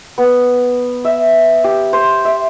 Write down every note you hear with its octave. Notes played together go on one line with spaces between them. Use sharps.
B3
E5
G4
C5
E5